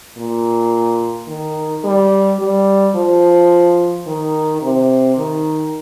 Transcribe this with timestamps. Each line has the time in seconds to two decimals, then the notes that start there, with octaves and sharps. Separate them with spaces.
0.17 A#2
1.28 D#3
1.84 G3
2.40 G3
2.95 F3
4.07 D#3
4.62 C3
5.19 D#3